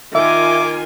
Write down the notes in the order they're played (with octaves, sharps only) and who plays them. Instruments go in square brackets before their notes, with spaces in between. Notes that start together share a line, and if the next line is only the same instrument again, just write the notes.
[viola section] D#3 F4 G#5 [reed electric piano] E5 [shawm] D6